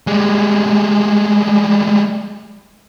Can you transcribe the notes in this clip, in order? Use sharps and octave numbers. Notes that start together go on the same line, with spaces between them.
G3 G#3